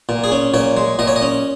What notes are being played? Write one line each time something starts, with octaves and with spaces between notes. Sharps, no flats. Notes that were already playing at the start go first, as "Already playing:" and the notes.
A#2
G#4
C#4
A#2 C#5
G#3
A#2 D#5
C#5
D#5
C#4